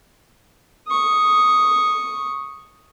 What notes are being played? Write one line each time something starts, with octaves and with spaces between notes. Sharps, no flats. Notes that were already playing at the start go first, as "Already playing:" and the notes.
C#6 D#6